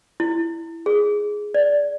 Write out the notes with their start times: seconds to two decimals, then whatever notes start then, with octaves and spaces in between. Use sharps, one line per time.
0.20 E4
0.86 G#4
1.54 D5